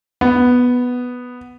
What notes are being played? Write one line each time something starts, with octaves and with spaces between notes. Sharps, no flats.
B3